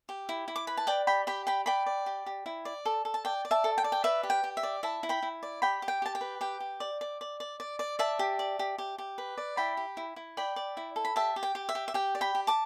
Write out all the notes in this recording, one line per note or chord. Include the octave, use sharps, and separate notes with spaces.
G4
E4
E4
D6
B4 B5
A5
D5 G5
G4 G5 B5
G4 G5 B5
D5 G5 B5
D5 G5 B5
D5
G4
G4
E4
D5
A4
A4
A5
D5 G5
D5
E5 A5
A4
G5
D5
G5
B4 E5
G4
G5
G4
E5
D5
E4 E5 A5
E4
G5 B5
E4
D5
G4 G5 B5
G4
G5
G4 A5
G5
B4
G4 G5
G4
D5
D5
D5
D5
D5
D5
D5 E5 A5
G4
D5
G4
G4
G4
B4
D5
E4 G5 B5
G4
E4
E4
D5 G5 B5
D5
E4
A4
B5
G4 E5 A5
G4
G5
G4
E5
G4
E5
G4 G5
D5
G5 B5
G4
A5 D6